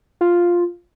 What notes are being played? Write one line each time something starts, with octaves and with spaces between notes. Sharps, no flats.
F4